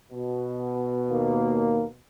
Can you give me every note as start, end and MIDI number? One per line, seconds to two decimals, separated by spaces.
0.12 1.96 47
1.09 1.84 39
1.09 1.84 58